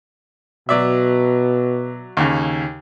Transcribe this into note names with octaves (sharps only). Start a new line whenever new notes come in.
B2 F#3 D5 E5
D#2 C#3